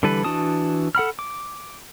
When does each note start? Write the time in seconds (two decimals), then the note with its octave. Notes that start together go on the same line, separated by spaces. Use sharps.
0.03 D3 E3 G3 A4 B4
0.24 E3 D4 F#4 A5 D#6
0.95 A4 F#5 B5 F6
1.19 D6